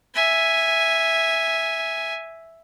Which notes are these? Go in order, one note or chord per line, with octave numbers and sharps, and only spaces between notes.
E5 G#5